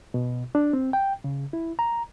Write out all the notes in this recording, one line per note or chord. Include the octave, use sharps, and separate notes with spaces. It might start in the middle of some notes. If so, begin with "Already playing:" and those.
B2
D4
C4
G5
C#3
E4
A#5